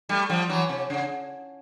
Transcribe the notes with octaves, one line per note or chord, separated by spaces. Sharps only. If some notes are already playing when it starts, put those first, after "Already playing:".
G3 A3
F3 G3
E3 F#3
C3
C#3